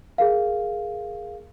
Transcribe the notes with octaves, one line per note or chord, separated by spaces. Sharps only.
G#4 A#4 F5